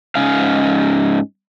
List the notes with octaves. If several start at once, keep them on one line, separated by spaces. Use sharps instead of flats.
G#2 C#4 F5